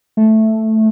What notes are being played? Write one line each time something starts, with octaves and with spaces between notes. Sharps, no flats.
A3